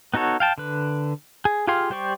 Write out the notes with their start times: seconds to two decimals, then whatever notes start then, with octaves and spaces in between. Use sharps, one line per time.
0.14 B3 D#4 F#4 A4 C#5
0.40 F5 G5 A5
0.58 D3 B4
1.45 G#4
1.67 F4 G4 G#4 F5 C6
1.90 G3 G4 C5 D5 C#6